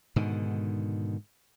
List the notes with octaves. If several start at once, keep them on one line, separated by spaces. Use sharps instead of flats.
G#2 B2 D3 D#3